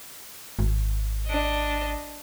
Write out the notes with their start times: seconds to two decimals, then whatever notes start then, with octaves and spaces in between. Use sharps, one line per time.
0.59 G#1
1.27 D4 D#5